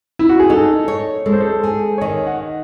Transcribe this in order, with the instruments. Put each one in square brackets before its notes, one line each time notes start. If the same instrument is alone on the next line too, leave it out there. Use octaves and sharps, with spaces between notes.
[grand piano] E4
F#4
G#4
[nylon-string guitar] D#4 [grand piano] A4
[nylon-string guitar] C#5
[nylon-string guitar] G#3 [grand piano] A4
[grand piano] C5
A4
[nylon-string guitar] G#4
[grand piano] C#5
[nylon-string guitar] D#3 [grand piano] D#5
[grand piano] F#5